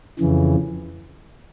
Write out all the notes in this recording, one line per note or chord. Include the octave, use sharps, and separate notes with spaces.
F2 C#3 E3